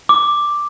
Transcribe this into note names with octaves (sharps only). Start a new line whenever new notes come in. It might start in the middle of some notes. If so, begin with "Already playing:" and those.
D6